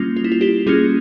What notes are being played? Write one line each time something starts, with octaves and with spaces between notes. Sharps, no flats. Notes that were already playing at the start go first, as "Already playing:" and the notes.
Already playing: G3 A#3 C#4 F4
F4
E4
F4
E4 G4
G3 A#3 C#4 F4 G#4